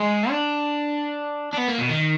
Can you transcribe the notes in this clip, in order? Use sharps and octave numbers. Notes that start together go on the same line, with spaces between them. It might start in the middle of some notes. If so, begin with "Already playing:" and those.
Already playing: G#3
D4
D4
B3
A#3
B2
D#3